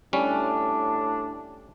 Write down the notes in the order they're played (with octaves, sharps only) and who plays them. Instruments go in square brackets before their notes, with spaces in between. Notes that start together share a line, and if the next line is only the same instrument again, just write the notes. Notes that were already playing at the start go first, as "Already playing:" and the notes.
[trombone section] A2 D4 [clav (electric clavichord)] G3 C#4